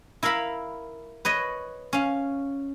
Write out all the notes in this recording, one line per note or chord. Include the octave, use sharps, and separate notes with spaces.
E4 A#4 E5 F5 B5
B4 C#5 D#5
C#4 F5